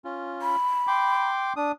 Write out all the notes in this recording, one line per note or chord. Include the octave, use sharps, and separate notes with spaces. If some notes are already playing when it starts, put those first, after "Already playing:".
C#4 F4
B5
G5 C6 D6
D4 D#6